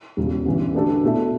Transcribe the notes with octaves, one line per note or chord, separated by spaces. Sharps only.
E1 E2 C#3
A1 G2 E3
D3 A3 D4 F#4 A4
B2 A3 E4 A4 E5